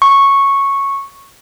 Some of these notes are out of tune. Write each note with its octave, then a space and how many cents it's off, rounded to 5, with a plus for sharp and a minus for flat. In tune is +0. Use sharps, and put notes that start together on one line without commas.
C#6 -5